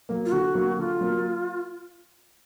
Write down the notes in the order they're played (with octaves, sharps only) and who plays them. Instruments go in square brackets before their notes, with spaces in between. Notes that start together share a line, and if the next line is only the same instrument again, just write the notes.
[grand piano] F#3 A#3
[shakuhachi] F4
[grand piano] D3 [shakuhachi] F#4
[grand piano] F#3 A#3
[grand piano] D3 [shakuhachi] F4
[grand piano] F#3 A#3